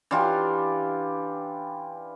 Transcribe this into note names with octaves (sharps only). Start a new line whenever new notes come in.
E3 D4 F4 G4